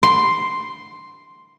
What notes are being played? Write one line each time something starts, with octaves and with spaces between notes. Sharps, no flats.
C6